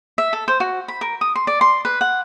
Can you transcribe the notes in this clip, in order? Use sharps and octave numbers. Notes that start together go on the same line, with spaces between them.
E5
A4
C5
F#4
B5
A#4
D#6
C6
D5
C6
B4
F#5